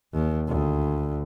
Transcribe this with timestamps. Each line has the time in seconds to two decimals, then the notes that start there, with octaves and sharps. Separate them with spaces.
0.14 D#2
0.47 D2